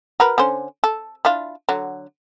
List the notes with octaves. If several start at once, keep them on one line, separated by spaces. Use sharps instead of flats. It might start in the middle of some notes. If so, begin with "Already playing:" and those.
F#4 A#4 B4
D3 C#4 C5
A4
D4 E4 F4
D3 F#3